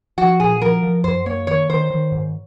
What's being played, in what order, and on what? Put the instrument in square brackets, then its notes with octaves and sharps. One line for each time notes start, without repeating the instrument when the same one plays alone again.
[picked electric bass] F3 [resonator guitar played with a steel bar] F#4
[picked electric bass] A#2 [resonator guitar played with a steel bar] G#4
[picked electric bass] F3 [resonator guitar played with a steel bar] A#4
[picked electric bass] F3
[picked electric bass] F#2 [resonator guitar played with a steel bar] C5
[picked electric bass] A#3 [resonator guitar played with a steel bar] C#5
[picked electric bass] D#3 [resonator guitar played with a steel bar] C#5
[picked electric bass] D#3 [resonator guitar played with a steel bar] C5
[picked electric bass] D#3
G#2